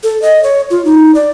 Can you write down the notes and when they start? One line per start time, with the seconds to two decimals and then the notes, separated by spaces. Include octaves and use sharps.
0.03 A4
0.22 D#5
0.43 C#5
0.70 F4
0.85 D#4
1.15 D5